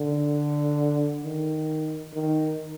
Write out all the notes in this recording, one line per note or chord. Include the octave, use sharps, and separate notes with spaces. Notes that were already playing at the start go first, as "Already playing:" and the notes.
Already playing: D3
D#3
D#3